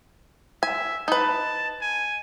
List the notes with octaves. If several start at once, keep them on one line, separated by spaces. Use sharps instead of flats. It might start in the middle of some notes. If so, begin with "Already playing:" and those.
E5 G#5
D#4 B4 A5
G#5